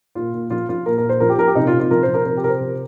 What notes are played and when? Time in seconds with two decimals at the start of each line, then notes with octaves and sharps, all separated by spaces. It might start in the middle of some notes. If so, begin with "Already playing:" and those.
0.15 A#2 F4
0.34 A#2
0.50 F3 F4
0.69 F3 F4
0.86 A#2 A#4
0.98 A#4
1.04 A#2
1.09 C5
1.20 F3 A#4
1.29 G4
1.38 F3 A#4
1.48 G4
1.55 C3 D#4
1.67 F4
1.73 C3
1.80 F4
1.91 F3 A#4
2.03 F3 C5
2.14 A#4
2.25 C3 A#4
2.37 G4
2.43 C3 A#4
2.49 C5
2.60 F3